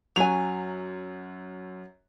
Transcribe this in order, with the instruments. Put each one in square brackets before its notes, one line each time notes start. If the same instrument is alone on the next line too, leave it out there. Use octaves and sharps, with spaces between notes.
[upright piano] F#2 F#4 F7 [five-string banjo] F#3 G#5